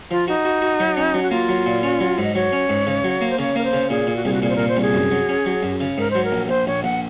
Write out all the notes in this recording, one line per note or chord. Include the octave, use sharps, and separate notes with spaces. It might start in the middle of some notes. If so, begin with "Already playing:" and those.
F3 F4
D#4 F#4
F#4
F#4
F#3
C#4
F#3
F#4
A#3 F4
F#3
A#2
C#4
F#3
G#2
D#5
F#3 C#5
C#4
G#2
C#3
F#3
A#3
C5
C#3 C#5
A#3 A#4
C5
C#3
A#2 G#4
A#2
F#4
C2 G#4
F#4
A#2 G#4
C5
A#2 A#4
C5
C2 G#4
F#2
F#3
C#4
F#3
F#2
C#3
G#2 A#4
F#3 C5
A#4
A#1
A#4
A#1 C5
A#1 C#5
A#1 F#5